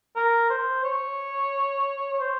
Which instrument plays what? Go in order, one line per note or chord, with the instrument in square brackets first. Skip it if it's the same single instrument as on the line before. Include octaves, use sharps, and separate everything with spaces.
[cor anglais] A#4
C5
C#5
C#5
C5